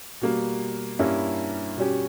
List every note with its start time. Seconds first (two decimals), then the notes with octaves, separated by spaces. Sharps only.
0.21 B2 G3 A#3
0.99 G2 G3 A#3 C#4 E4
1.76 B2 G3 C#4 G4